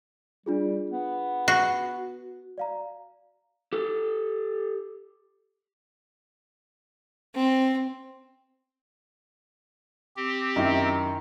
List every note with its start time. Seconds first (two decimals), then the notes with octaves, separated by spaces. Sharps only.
0.46 G3 D4 F4 G#4
0.92 B3
1.48 F#4
2.58 D5 F5 A#5
3.73 G4 A4
7.35 C4
10.17 C4 G4
10.56 F#2 D#3 E4